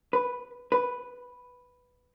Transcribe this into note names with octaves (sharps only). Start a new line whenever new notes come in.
B4
B4